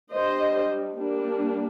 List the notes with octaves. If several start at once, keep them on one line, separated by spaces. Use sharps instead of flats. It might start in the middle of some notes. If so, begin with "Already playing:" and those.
G3 D4 C5 D#5
G3 A#3 D4